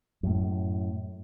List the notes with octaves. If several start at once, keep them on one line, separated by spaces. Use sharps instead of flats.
F#2 A2